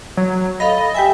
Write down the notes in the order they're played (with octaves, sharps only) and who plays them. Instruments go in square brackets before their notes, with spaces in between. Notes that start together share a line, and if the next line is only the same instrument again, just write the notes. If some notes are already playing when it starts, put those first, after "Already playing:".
[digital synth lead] F#3
[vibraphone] A4 F5 B5 [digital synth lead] D#5
[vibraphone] G4 G5 G#5 [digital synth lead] E5